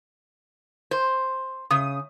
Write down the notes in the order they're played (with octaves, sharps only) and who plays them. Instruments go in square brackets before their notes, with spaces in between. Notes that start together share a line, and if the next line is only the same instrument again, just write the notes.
[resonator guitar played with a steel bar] C5
[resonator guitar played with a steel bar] C#3 [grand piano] D#6